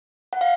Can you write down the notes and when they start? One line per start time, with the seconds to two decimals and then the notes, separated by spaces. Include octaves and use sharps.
0.33 F#5
0.41 F5